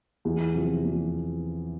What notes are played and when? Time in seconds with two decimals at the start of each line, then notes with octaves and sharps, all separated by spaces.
0.25 E2
0.54 C3 F3
0.84 E2